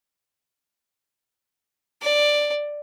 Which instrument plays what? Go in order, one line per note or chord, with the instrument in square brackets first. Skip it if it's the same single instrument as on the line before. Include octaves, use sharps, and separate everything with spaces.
[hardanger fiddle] D5